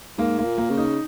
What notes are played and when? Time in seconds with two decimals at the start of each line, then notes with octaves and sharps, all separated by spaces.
0.18 G#2 A#3
0.39 A#3
0.44 A#2
0.58 A#3
0.71 C#3
0.77 D#4